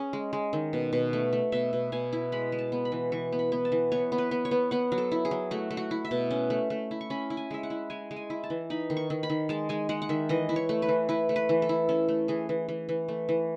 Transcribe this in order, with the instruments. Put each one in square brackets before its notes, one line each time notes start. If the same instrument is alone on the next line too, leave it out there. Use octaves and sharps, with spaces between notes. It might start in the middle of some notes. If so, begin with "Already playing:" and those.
Already playing: [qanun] C#4 G#4
G#3
G#3
D#3
B2
B2
A3
A3
B2 E5
B2
B2 G#5
E4
G#3 B5
G#3
A5
B3
B5
E3
E3 C#6
B3
B5
B3
A5
E3
B3 C#5
B3
B4
B3
C#5
B3
B3 F#5
F#3
A4
E4
G#4
F#3
A3 F#4
A3
F#4
E4
E5
B2
C#4
A3
A3
E4
C#6
C#4 B5
E4
G#5
G#3 E5
F#5
E4
G#3 G#5
G#3
G#5
E4
A5
E3
D#4 B5
D#3
C#6
D#3
B5
D#3
G#3 A5
G#3 G#5
G#3 F#5
F#5
D#3 E5
E3 D#5
E4
C#5
A3
B4
E3
E4 B4
A3
B4
E3
A4
E4
C#4 A4
A3
E3 G#4
E3
E3
E3
A3
E3